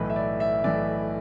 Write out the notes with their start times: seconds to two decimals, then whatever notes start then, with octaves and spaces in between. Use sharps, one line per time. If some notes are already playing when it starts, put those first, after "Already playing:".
Already playing: B1 A2 E3 B4
0.10 E5
0.16 D5
0.40 E5
0.64 B1 A2 E3 D5